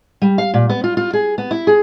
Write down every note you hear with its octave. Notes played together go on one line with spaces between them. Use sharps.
G3
F5
A#2
B3
F4
F4
G#4
B3
E4
G#4